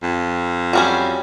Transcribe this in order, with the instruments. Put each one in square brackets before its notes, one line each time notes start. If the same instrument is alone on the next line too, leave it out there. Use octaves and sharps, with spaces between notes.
[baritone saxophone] F2
[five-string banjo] F#3 G3 C#4